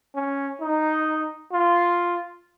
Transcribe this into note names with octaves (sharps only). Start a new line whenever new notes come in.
C#4
D#4
F4